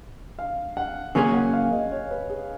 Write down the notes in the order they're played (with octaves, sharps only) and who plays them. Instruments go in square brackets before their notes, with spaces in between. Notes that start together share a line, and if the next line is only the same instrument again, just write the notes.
[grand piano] F5
F#5
[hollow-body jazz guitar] C#3 F#3 A#3 C#4 G#4 [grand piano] G#5
[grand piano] F#5
F5
D#5
C#5
B4
G#4